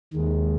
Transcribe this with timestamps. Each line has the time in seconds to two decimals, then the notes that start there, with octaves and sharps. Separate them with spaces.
0.13 D#2 D#3 G#3